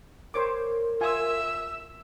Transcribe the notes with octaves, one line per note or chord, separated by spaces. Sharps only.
A#4 C5 C#5 D6
F4 E5 G#5 E6